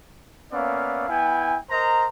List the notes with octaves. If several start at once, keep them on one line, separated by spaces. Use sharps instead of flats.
A#3 B3 C#4 D5 E5 F5
B3 E4 G5 G#5
A#4 C5 D#5 A#5